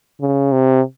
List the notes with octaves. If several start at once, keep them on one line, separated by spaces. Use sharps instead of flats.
C#3
C3